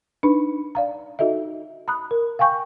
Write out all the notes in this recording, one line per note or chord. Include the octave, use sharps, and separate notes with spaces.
D4 D#4 B4 B5
D5 F5 A#5
D#4 F#4 A4 D#5 E5
A#5 B5 D#6 F#6
A#4
F5 G5 G#5 C#6 G6